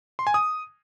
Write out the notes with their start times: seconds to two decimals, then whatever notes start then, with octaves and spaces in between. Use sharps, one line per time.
0.19 C6
0.27 G#5
0.34 D#6